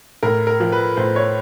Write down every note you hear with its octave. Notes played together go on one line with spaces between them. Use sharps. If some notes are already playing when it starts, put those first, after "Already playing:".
A2 A#4
A#4
F3
B4
A2 C5
C#5